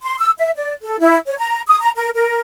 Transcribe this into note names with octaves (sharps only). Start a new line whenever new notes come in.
C6
E6
E5
D5
A4
E4
C#5
A#5
D#6
A#5
A#4
A#4